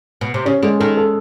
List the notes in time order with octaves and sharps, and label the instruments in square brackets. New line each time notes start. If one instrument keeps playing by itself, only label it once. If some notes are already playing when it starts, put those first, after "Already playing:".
[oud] B2
C3
[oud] C#3 [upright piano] C#4
[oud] D3 [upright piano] G#3
[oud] D#3 [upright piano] A4
[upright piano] A4